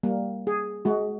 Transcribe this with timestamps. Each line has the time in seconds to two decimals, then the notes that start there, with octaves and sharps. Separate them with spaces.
0.03 G3 A#3
0.47 G#4
0.85 G#3 F#4